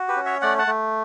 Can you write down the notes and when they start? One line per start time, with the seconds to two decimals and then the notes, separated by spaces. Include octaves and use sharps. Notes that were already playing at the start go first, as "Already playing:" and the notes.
Already playing: F#4
0.08 G4 B4
0.17 C#4
0.26 C#5 E5
0.42 A3 D5 F#5
0.59 F#5 A5
0.67 A3